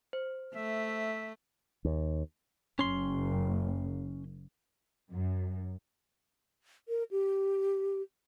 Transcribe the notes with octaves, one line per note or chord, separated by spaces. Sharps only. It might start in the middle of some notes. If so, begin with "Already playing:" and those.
C5
A3 E5
D#2
F#1 C#4 C6
F#2
A#4
G4